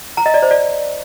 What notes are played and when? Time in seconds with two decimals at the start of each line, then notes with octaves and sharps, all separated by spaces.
0.17 A#5
0.26 D#5
0.34 D5
0.42 C5
0.51 D5